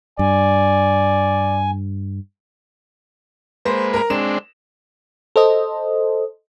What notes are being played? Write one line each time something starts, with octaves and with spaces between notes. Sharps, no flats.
G2 D5 G#5
G#3 A#3 B4 C5
A#4 A#5
G#3 C4 D4 E7
A4 C5 D#5